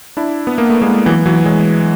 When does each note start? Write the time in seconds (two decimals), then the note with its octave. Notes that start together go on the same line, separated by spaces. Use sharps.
0.17 D4 E4
0.47 B3
0.58 A#3
0.70 A3
0.81 G#3 A#3
1.06 E3 F#3
1.25 E3 F#3
1.45 F#3 G#3